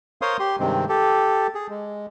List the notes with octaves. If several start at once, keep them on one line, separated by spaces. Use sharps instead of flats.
A#4 C5 C#5 F5 C6 D#6
G4 C6
G2 C3 D#3 G#3 C4
G4 A4
G#4
G#3